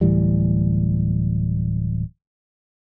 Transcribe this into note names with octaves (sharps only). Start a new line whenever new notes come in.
D1 A2 E3 G3